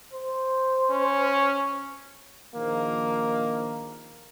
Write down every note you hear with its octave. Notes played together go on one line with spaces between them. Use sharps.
C5
C#4
A#1 D#3 F3 A#3